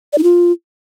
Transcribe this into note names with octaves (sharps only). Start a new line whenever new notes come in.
D5
D#4
F4